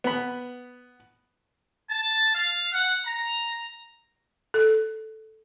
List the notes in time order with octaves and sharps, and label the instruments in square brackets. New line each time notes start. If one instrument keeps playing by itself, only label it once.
[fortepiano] B3 B5
[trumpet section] A5
F5
F#5
A#5
[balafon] A4